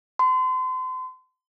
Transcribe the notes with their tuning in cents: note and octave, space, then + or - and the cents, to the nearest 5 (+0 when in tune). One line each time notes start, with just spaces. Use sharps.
C6 -35